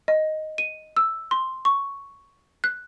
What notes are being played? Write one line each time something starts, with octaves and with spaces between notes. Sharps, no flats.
D#5
D#7
E6
C6
C#6
F#6